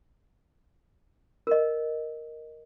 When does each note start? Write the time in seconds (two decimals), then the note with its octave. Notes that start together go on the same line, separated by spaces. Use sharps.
1.47 A#4 D#5